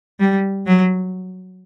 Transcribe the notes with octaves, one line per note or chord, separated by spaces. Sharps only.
G3
F#3